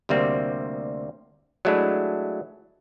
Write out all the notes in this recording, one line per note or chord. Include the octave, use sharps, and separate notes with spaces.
D2 C3 G3 A#3 C4
F#3 G#3 A3 D4 E4